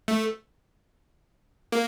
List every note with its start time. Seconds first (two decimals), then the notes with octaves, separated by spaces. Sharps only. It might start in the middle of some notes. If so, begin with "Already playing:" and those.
0.08 A3
1.72 A#3